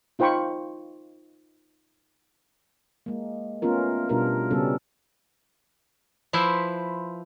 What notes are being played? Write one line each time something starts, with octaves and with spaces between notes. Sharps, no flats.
D#4 F4 C5 G5 B5 C#6
G#3 A#3
A3 B3 C#4 F4 A#4
B2 G3 D4 F4 A#4
C#3 G3 B3 C#4 A4
F3 E4 B4 C5 E5